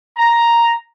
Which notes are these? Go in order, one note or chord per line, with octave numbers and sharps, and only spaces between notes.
A#5